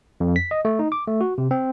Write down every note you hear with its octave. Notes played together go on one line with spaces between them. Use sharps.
F2
B6
D#5
A3
D#4
D6
A3
F#4
C3
C4